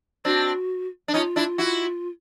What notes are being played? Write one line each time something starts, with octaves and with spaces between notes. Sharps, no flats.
C4 D4 F#4
D4
C#4 D#4 F4
D4 E4
E4 F#4